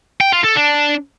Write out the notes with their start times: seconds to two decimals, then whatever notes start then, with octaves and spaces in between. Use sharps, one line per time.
0.20 G5
0.32 F4
0.44 A4
0.56 D4